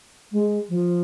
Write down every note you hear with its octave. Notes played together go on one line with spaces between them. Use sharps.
G#3
F3